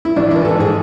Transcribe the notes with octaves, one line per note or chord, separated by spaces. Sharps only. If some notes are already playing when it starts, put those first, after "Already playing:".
E4
A1 D4
E3 E4
A4
G#2
G#4